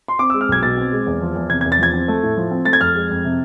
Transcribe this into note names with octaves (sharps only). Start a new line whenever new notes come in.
C6
C4 D6
E6
G#3
F6
B1 G#6
B2 A6
C4
G#3
E2
F3
E2
C3 G#6
G#6
E2
A6
F3 G#6
C4
A3
A2
F3
C4
A3 A6
G#6
F2 F6
G#3
F2
C3